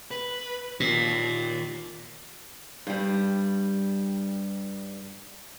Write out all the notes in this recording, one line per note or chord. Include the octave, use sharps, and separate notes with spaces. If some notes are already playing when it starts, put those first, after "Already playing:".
B4
D#2 A#2
G2 G3